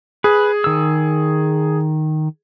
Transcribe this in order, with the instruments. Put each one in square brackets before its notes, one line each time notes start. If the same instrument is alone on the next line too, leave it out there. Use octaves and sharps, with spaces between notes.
[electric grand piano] G#4 [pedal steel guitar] B4
[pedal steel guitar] D#3 E6